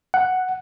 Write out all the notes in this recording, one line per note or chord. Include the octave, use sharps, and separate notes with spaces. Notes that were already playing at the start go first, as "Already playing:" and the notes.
F#5